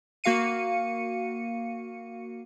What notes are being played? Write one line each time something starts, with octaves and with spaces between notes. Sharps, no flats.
A#3 F#4 F5 C#7 D#7